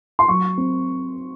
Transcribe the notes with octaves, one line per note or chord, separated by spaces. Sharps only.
C6
F#3 C#6
C4